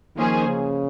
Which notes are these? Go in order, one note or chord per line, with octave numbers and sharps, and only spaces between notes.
D#3 F3 A#3 C#4 G#4 C5
C#3